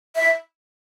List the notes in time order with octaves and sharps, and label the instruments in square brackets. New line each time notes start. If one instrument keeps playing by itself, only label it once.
[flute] E5